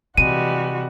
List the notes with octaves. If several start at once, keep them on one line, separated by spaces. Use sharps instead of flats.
C3 E3 G3 G#3 F#4 D#7